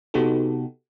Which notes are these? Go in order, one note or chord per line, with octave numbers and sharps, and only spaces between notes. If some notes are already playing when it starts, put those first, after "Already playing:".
C3 B3 D#4 F#4 G4 A4